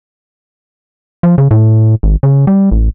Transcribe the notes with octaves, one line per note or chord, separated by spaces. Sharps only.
F3
C#3
A2
G#1
C#3
G3
A1